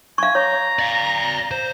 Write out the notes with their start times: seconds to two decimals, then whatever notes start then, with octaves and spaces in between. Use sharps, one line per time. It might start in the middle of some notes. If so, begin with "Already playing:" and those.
0.18 F5 G#5 C#6
0.35 C#5 A#5
0.79 D5 F5
1.51 C5